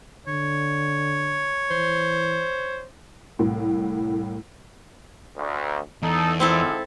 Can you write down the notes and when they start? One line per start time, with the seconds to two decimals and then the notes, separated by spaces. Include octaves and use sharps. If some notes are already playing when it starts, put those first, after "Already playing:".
0.27 D3 C#5
1.71 E3 C5
3.39 C2 A2
5.37 D2
6.02 E2 D#4 A4
6.40 G#2 F3 C4 E4 A4